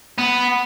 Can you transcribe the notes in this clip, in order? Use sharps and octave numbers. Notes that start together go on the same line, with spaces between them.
B3